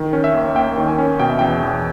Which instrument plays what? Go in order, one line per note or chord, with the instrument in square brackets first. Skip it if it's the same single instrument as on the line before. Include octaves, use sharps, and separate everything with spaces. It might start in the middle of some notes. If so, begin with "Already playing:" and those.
Already playing: [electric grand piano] D#3
C#4
E5
D#2
A#3 G5
D#3
G#5
C#4
B2 G5
E5
E2 G5
E2